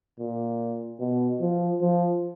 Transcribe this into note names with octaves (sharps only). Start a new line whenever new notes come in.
A#2
B2
F3
F3